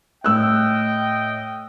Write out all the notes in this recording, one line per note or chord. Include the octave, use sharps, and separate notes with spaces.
A2 D#5 G5 E6 F#6